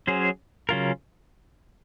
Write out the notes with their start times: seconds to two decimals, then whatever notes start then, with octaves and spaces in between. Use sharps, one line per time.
0.07 F#3 C#4 G#4 C5
0.69 C#3 F#3 C#4 F4 A#4